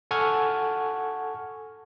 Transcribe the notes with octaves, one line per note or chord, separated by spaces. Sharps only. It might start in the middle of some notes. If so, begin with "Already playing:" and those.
A4 F#5 G#5 C#6 F6 G#6